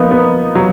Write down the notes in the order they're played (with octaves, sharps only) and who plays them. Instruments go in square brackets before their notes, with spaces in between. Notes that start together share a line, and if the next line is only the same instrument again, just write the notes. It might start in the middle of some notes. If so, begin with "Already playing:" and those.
Already playing: [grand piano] F3 A#3 F4 [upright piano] B3 D#4
[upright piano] B3
F#3